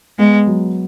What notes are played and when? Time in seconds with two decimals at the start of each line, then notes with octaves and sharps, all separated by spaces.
0.18 G#3 B3
0.47 F#3